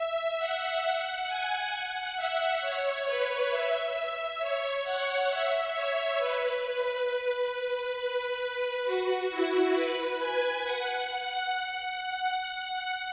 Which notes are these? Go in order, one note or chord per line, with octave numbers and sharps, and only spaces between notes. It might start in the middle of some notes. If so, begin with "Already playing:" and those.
Already playing: E5
F#5
G#5
F#5
E5
C#5
B4
E5
C#5
F#5
E5
C#5
B4
B4
B4
F#4
E4
B4
G#5
F#5